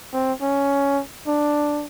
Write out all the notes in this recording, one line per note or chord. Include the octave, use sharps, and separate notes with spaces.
C4
C#4
D4